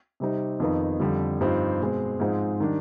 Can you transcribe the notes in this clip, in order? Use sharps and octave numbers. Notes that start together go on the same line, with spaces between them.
C3 G3 C4 D#4
F2 D#3 B3 D#4
F2 D3 G3
G2 F3 C4 D#4
B2 G#3 C4
G#2 F3 G#3 C4 D#4
D#3 G3 D4